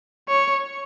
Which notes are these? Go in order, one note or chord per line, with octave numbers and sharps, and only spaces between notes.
C#5